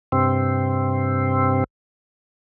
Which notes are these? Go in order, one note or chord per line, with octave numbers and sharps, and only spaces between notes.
G2 C3 C4